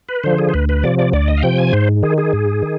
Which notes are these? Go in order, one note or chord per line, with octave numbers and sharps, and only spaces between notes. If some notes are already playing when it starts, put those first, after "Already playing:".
B4
D3 F3 C5
G#4
C5
D2 B4
B4
C3 F3 D5
D5
D2 D5
D#5
F5
C3 F3 G5
G#5
G#2 C5
D#3 G#4
G#4
G#2
D#3